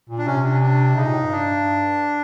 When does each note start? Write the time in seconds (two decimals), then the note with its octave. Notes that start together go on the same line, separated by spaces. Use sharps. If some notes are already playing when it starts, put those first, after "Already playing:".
0.10 A#2
0.18 D4
0.26 C3 C#4
0.44 D4
0.62 D4
0.96 C#3 D#4
1.05 A#2
1.13 A2
1.22 G2
1.31 D4